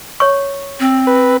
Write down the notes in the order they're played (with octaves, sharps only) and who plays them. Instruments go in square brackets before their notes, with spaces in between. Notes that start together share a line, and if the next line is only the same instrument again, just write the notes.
[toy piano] C#5 C#6
[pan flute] C4
[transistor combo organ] B4